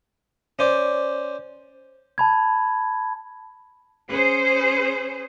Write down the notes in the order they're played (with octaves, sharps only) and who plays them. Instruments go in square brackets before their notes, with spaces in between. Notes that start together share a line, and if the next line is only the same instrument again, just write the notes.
[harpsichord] C#4 C5 D5
[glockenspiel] A5 B5 G#6
[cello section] C#4 G#4 C5